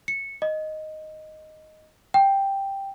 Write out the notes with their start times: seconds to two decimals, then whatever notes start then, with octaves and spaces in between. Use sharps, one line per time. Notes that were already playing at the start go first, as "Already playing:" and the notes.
0.08 C#7
0.42 D#5
2.14 G5